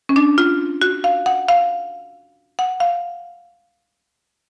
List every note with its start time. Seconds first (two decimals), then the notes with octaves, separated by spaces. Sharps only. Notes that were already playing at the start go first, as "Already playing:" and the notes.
0.09 C#4
0.16 D4
0.38 F4
0.81 F#4
1.04 F5
1.26 F#5
1.48 F5
2.59 F#5
2.80 F5